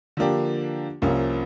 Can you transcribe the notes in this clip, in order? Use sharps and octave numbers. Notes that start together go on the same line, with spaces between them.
D3 F3 A#3 D4 G4
C2 C3 F3 A#3 C#4